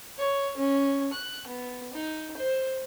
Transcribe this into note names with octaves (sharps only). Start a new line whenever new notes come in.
C#5
C#4
F#6
B3
D#4
C5